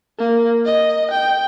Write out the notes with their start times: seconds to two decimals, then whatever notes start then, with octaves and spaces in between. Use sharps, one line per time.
0.19 A#3
0.65 D#5
1.11 G5